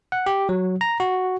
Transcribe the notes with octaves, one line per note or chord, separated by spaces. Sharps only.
F#5
G4
F#3
A#5
F#4